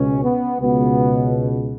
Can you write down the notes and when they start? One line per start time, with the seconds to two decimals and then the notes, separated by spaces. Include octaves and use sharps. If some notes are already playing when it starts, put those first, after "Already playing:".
Already playing: C#2 B2 C#4
0.23 B3
0.59 C#2 B2 B3